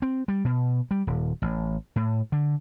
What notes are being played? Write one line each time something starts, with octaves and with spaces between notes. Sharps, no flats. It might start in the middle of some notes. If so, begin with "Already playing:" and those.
C4
G3
B2
G3
D#1
A1
A2
D3